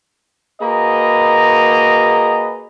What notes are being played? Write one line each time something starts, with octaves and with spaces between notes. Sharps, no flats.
A#3 F#4 G#4 B4 D#5 A#5